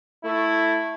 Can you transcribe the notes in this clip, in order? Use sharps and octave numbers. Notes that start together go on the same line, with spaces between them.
A3 E4